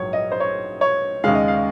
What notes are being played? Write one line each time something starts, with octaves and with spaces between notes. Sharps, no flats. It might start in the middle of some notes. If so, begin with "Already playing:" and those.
Already playing: A#1 G#2 F#3 C#5
D#5
C5
C#5
C#5
D#2 C#3 G#3 F5
D#5
F5